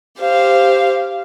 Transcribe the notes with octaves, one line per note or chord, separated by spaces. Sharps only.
G4 C5 F5